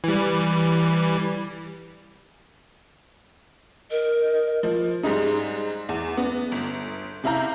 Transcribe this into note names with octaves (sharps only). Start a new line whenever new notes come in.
E3 G3
A#4 D#5
F3
G#2 G3 G#3 D#4
E2
B3
G1
C3 E4 F5 A#5 G6